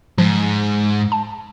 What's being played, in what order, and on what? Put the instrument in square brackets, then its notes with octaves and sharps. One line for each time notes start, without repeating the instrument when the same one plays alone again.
[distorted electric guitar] G#2 [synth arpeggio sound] F3
[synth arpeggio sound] A5